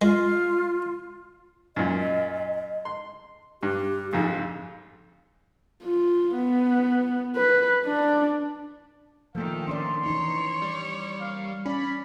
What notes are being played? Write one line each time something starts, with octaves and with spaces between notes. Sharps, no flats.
G#3 F4
F#2 A#2 D#5
C6
G2 G4
A#1 F2 G#2 F5
F4
B3
B4
D4
A#2 D#3 F3 A3 A4 F5 G5
C#4 D4 D5 C6
E3 D#4 C#5
G3
A#3 C4 F5
C#4 D5 B5